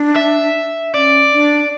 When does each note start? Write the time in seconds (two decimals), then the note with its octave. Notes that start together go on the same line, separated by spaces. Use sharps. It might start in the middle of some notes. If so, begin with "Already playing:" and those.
Already playing: D4
0.16 E5
0.94 C#4 D5
1.33 D4